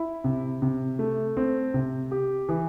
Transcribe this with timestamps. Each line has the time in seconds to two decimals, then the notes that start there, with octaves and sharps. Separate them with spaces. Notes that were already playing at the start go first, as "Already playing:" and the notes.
Already playing: E4
0.24 C3
0.62 C3
0.99 A3
1.37 C4
1.74 C3
2.11 G4
2.49 E3